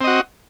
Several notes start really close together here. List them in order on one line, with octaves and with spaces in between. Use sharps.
C4 D#5 F#4